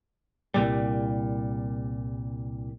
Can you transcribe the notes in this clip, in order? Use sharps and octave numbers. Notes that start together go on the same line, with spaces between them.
C2 A#2 G3